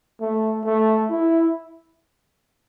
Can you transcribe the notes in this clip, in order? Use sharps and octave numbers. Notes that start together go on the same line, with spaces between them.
A3
A3
E4